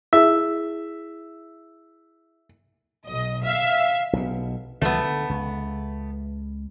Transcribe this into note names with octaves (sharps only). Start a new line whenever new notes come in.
E4 G#4 E5
B1 D#5
E5 F5
B1 B2
C#2 D#3 F#3 A3 B3
D3
C#2